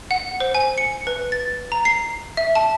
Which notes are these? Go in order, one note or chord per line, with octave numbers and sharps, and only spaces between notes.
F#5
C5
G#5
C#7
B4
A6
A#5
C7
E5
A5